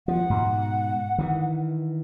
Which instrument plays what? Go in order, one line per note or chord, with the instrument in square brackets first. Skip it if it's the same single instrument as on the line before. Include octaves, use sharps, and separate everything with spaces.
[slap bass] F3 [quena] F#5
[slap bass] G#2 B2
D#3 E3